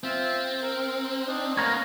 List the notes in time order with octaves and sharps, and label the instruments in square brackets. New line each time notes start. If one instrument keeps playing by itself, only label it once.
[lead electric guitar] C4 [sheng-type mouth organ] F4 E5
[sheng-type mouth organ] A#4
D4 D#4
[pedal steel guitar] A#3 A#4 C#5 [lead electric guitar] B3 C#4 [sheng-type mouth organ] F5 C6 F6